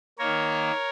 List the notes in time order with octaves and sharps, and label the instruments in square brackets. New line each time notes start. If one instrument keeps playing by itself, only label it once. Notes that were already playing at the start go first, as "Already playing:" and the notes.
[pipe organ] D#3 A#3 A#4 C#5